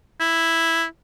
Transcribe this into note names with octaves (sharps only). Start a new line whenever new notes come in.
E4